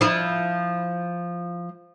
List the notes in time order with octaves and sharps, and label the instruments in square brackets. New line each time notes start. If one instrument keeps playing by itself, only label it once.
[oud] F3 E4